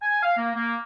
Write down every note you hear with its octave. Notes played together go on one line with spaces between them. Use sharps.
G#5
F5
A#3
A#3